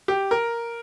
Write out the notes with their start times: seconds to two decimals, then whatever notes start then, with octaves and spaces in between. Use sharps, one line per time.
0.08 G4
0.31 A#4